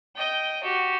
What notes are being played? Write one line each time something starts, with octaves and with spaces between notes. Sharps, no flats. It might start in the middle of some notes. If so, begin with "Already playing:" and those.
D#5 G5
F#4 G4